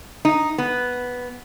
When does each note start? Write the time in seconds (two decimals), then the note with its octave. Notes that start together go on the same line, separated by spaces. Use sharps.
0.25 D#4
0.58 B3